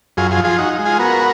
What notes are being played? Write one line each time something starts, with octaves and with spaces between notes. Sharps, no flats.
F#2 F4 G#4
F4 G#4
F3
F4 G#4
D#4 F#4
G#3
F4 G#4
B3 F#4 A#4